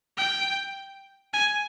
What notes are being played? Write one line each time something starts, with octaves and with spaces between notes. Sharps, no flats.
G5
G#5